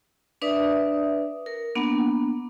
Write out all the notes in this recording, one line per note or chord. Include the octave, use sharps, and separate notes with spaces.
D4 B4 D5 E5 D#6
A#4
A#3 B3 D4 F#5